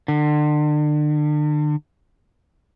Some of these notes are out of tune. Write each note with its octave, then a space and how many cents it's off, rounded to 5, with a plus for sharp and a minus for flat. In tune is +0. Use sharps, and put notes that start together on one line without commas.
D3 +35